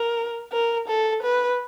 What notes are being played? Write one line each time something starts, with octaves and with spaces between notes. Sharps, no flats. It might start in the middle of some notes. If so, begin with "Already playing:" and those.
Already playing: A#4
A#4
A4
B4